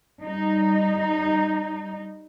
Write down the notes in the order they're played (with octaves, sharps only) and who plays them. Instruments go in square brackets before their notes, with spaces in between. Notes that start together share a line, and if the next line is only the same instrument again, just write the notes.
[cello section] G3 D#4